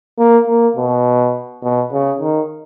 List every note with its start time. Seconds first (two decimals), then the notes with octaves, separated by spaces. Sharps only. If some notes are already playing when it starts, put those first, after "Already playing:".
0.18 A#3
0.48 A#3
0.77 B2
1.63 B2
1.92 C#3
2.21 D#3